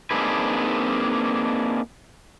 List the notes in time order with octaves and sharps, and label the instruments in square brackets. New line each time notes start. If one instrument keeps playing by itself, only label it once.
[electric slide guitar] A#3 C4 D4 D#4 G#4 B4